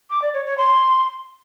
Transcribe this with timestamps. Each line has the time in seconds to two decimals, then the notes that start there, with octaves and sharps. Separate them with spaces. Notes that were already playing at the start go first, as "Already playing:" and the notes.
0.10 D6
0.22 D5
0.34 C#5
0.46 C#5
0.58 C6